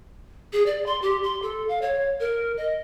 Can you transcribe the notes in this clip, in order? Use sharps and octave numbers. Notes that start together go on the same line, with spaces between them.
G#4
D5
C6
G4
C6
A4
F5
C#5
A#4
D#5